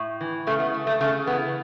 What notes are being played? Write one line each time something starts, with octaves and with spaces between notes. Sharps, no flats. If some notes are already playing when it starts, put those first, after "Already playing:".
Already playing: A2
E3
C#3 A3
B3
A3
A3
C#3 A3
E3 B3